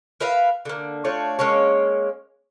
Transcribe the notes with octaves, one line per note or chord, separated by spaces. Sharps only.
A#4 B4 E5 F5
D3 A#3
A3 D4 F4 C#5
G#3 A#3 C#4 C#5